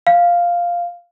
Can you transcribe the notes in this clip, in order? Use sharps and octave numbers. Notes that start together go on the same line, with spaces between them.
F5